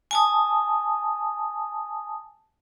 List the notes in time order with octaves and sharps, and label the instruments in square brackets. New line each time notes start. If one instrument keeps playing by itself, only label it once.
[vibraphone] G#5 A5 D#6